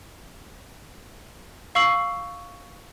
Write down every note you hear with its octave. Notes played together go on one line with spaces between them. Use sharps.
F5 C#6 E6 C7 F#7